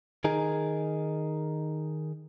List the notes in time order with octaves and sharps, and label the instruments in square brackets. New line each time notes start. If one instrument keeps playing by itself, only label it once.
[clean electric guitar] D#3 D#4 G#4 A#4